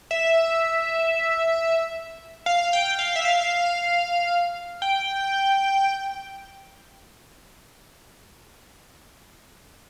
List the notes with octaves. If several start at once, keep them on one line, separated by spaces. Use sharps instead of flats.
E5
F5
G5
F5
E5
F5
G5